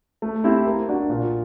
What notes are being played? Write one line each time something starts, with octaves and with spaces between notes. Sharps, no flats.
A3
C4 E4 G4 C5
A#3
D4 F#4
A#2